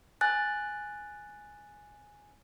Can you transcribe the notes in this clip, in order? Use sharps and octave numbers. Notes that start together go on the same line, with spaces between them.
G#5 F#6 A6